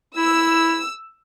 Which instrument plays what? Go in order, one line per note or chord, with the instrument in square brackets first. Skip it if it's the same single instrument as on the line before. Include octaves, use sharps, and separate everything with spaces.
[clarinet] E4 [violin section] E6